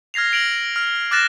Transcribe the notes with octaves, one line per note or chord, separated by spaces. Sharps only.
F6 G#6 A#6 C7 F7
A#6 D7 F7 F#7
F6
D6 F6 F#6 A6 A#6 E7